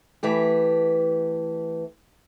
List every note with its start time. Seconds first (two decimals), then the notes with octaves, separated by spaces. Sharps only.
0.23 E3 A3 G4